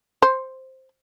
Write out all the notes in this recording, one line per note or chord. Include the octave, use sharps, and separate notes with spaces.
C5